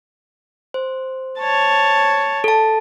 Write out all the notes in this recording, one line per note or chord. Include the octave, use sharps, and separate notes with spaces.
C5
C#5 A5
A4 A5